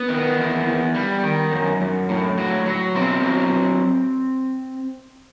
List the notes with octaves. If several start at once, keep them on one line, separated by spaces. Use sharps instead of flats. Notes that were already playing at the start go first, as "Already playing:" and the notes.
Already playing: B3
D#3
E2
E2
G3
D#3
F#2
F#2
A2
F#3
F#3
B2 C4
F#3